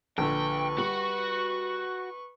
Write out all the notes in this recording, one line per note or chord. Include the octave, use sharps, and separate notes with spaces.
A#1 D3 B4 G5 C#6
G3 F#4